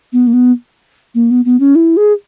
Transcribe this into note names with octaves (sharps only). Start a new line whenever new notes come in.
B3
A#3
B3
A#3
B3
B3
C#4
E4
G#4